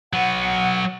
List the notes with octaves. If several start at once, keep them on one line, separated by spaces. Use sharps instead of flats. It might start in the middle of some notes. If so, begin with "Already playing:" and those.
F#3 B4 F#5